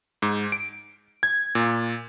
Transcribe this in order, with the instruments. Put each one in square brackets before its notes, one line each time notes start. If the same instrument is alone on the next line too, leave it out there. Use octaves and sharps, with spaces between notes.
[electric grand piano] G#2
D7
G#6
A#2